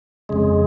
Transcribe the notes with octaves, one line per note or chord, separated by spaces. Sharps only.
F2 C#3 G#3